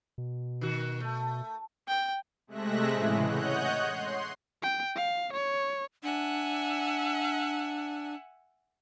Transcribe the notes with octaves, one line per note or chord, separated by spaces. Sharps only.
B2
D#3 F#4
A3
G5
C3 G#3 A3 E5 F#6 A#6
A2 C#3 E3 G#3
C#5 D#5 F#5 F#6 G6
C6
G5
F5
C#5
D4 E5 F#5 G#5